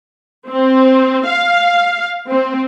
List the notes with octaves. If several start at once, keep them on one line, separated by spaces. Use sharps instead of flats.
C4
F5
C4